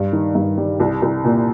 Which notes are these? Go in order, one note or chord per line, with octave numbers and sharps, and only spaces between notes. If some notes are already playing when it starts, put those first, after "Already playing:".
Already playing: G2
D#3
G2
G3
C2
C2
A#2